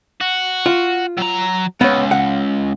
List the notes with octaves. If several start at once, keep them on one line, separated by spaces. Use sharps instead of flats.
F#4
F4
F#3 A#5
C#2 B3 C#5
F#5